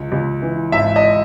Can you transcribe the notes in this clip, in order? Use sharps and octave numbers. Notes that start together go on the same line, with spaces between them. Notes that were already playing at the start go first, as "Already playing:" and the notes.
Already playing: C#2
C#2
E3
G#1 E5
D#5